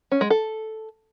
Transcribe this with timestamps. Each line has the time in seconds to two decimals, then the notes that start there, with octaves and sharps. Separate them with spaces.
0.11 C#4
0.21 G#3
0.30 A4